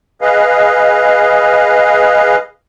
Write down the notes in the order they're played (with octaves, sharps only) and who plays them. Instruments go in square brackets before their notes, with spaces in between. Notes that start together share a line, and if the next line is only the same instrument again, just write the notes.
[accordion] G#4 B4 D#5 F5